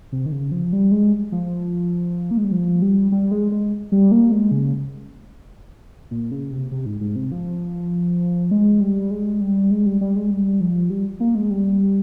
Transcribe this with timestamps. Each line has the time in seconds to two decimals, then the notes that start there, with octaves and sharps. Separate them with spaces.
0.12 C3
0.26 D#3
0.32 C#3
0.52 F3
0.73 G3
0.92 G#3
1.32 F3
2.31 A#3
2.38 G#3
2.45 G3
2.52 F3
2.82 G3
3.12 G3
3.31 G#3
3.52 G#3
3.92 G3
4.12 A#3
4.32 G#3
4.51 C#3
6.11 A#2
6.31 C#3
6.51 C3
6.71 C3
6.86 G#2
7.01 G#2
7.16 C3
7.32 F3
8.51 G#3
8.80 G3
9.11 G#3
9.41 G3
9.71 G#3
9.86 G3
10.01 G3
10.16 G#3
10.31 G3
10.61 F3
10.90 G3
11.20 A#3
11.35 G#3
11.51 G3